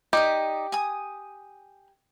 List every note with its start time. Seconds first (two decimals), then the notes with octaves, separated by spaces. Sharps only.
0.13 D#4 G4 D5 D#6
0.72 G#5 D#6